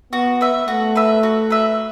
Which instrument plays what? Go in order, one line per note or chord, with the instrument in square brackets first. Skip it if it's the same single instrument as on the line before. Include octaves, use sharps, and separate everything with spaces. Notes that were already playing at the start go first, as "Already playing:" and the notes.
[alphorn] B3 [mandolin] F#4
[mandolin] B4 E5
[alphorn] A3 [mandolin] F#4
[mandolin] B4 E5
F#4
B4 E5